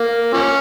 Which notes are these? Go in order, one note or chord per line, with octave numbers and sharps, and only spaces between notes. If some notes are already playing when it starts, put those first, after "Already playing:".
Already playing: A#3
F3 A#3 C#4